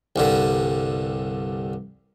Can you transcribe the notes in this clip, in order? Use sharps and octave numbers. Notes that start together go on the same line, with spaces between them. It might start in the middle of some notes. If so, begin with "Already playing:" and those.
C2 G2 D3